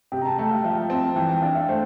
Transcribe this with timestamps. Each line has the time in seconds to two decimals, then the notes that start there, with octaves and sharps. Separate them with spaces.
0.12 C3 G5
0.21 A#5
0.25 A5
0.38 A3 G5
0.51 F5
0.64 F3 E5
0.78 G5
0.90 C4 A5
1.04 A5
1.16 E3 G5
1.29 G5
1.42 D4 F5
1.55 E5
1.68 A3 C5